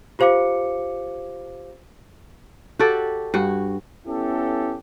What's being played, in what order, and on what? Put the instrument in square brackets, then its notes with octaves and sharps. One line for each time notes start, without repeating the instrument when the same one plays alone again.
[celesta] F4 G4 C5 F5 D6 C#7
[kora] F#4 G4 A4 D5
G2 F#4
[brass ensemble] B3 C#4 E4 G4 A4